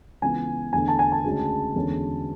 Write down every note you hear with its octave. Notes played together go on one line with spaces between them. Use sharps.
C#2 C#3 E3 B3 G#5
E2 D3 A3 D4 G#5
A5
G#5
A5
D2 C#3 G#3 C#4
E2 D3 G#3 C#4